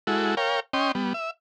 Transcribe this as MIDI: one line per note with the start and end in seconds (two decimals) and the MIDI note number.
0.07 0.35 56
0.07 0.35 64
0.07 0.35 66
0.07 0.35 69
0.37 0.60 70
0.37 0.60 73
0.37 0.60 77
0.37 0.60 79
0.73 0.92 61
0.73 0.92 75
0.73 0.92 79
0.73 0.92 84
0.95 1.13 55
0.95 1.13 59
1.14 1.31 76